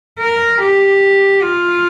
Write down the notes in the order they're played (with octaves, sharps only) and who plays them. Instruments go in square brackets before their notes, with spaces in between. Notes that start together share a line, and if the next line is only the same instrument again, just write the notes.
[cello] A#4
G4
F4